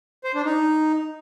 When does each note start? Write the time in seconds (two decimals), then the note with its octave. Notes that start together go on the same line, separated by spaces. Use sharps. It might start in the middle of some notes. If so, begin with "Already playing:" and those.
0.24 C5
0.35 D4
0.45 D#4